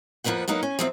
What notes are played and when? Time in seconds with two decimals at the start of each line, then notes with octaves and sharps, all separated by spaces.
0.24 F2 F3 A#3 C4 B4 F#5
0.48 F#3 A#3 D#4 B4 F#5
0.63 C#4
0.79 F3 F#3 C4 E5